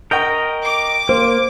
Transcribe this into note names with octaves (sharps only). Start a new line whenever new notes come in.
A#4 D#5 G5 C#6 G6
D6
A#3 C5